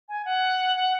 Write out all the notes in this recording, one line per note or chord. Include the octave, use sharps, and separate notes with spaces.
G#5
F#5
F#5